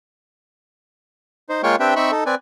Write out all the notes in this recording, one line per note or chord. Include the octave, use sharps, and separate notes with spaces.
D#4 C5
G#3 A#3 F4 C#5 G5 C#6
C4 D4 G4 B4 E5 G5
C4 D#4 E5 B5 C#6
D#4 A4
C4 B4 D5 G#5